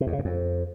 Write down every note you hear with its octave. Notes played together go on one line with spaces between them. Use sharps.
C3
E2
C#3
F#2
F2